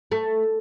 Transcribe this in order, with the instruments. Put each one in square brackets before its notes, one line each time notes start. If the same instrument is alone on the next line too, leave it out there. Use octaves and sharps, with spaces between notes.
[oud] A3